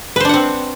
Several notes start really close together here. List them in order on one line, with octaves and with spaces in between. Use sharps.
B4 C5 D4 F#5 C4